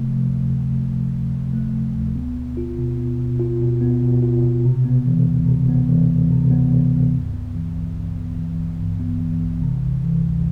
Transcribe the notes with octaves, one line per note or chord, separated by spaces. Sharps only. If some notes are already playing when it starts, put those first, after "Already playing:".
Already playing: C3 A3
F3
D2
C3
A3
F3
D2
C3
A3
F3
D2
B3
B2
F4
B2
B3
B2
F4
B2
B3
B2
F4
B2
C3
B3
E3
D2
C3
B3
E3
D2
C3
B3
E3
D2
G2
B3
E3
A1
G2
B3
E3
A1
G2
B3
E3
A1
C3
D2
E3
D2